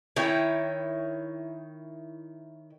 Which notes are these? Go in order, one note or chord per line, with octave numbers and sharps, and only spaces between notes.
D#3 E4 C#5 G5